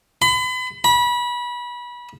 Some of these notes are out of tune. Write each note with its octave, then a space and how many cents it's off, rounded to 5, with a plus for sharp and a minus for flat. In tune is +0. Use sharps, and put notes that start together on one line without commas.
B5 +40
B5 -25